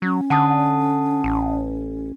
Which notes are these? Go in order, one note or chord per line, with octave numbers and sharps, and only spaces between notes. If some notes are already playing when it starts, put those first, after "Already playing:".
F#3 C#4
D3 F#5 A5 D#6
A1